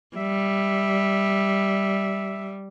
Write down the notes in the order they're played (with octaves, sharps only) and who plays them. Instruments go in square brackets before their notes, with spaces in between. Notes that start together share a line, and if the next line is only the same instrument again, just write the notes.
[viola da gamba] G3 [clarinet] E5